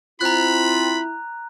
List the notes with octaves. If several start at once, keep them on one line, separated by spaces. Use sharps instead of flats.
C4 E4 F4 A#5 B5 F#6